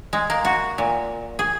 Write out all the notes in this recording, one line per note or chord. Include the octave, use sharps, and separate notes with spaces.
G#3
A#3
F#4
A#2
G#4